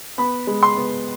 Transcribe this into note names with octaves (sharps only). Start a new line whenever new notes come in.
B3 B5
G#3
C6
B3